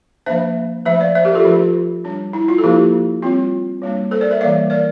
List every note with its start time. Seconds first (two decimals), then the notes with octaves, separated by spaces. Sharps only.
0.26 F3 A#3 D4 C5 E5
0.85 F3 A3 D4 C5 E5
1.00 D5 F5
1.15 C5 E5
1.25 G4 A#4
1.35 F4 A4
1.40 G4
1.45 F3 A3 D4 F4
2.04 G3 D4
2.33 E4
2.48 F4
2.58 A4
2.63 F3 A#3 D4 E4 G4
3.22 G3 C4 F4
3.82 G3 A#3 D4
4.11 A4 C5
4.21 A#4 D5
4.31 C5 E5
4.41 E3 G3 A#3 D5 F5
4.70 A#4 D5